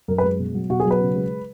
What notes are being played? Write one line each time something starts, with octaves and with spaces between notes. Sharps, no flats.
F#2 A#4
B4
G#3
B2
F#3
B2 F#4
G#4
F#3
B4
C#3
G#3